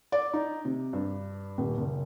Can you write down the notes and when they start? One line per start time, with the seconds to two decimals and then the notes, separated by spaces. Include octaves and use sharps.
0.12 D5
0.33 D#4
0.65 C3
0.93 G2
1.58 D#1
1.78 F#1